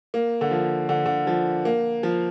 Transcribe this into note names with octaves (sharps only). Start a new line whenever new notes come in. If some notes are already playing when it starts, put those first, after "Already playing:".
A#3
D3
F3
D3
D3
F3
A#3
F3